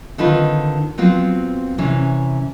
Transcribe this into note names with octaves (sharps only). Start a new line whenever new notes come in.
D3 D#3 C4 F4 B4
F3 F#3 B3 C4 F4
C3 E3 C#4